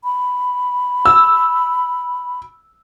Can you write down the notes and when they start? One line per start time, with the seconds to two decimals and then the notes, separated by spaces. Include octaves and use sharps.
0.04 B5
1.05 E6